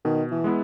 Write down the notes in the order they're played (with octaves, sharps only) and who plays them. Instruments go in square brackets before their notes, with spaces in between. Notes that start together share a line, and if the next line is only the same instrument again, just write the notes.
[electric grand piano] B2 [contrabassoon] D#3
[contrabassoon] E3
[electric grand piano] G#3 B3 E4